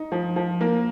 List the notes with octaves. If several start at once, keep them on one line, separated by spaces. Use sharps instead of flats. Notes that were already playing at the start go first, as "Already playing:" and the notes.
Already playing: D#4
F3
F3
A#3